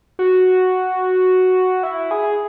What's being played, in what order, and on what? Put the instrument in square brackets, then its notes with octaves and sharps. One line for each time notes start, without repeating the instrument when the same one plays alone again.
[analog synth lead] F#4
E4
G#4